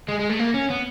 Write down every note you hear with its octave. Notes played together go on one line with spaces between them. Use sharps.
G#3
G#3
A3
A#3
C#4
B3